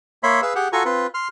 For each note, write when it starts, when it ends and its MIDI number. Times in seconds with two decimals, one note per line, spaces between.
0.23 0.41 58
0.23 0.41 73
0.23 0.41 76
0.23 0.41 83
0.23 0.41 84
0.42 0.53 68
0.42 0.53 71
0.42 0.53 77
0.42 0.53 88
0.55 0.68 67
0.55 0.68 68
0.55 0.68 78
0.73 0.83 65
0.73 0.83 66
0.73 0.83 69
0.73 0.83 80
0.73 0.83 82
0.73 0.83 85
0.85 1.07 60
0.85 1.07 65
0.85 1.07 71
1.14 1.28 84
1.14 1.28 89